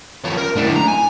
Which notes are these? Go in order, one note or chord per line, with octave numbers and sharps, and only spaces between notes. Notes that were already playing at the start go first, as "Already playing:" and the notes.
F3 C#4
A#4
A2 D4
A#5
G#5